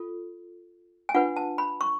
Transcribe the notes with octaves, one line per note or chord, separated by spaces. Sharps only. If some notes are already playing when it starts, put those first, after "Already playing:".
Already playing: F4 A4
G#5
D4 F4 B4 F#5
A5
B5
C#6